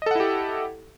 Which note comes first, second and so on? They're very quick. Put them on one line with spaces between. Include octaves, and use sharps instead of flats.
D#5 A4 F#5 E4 G4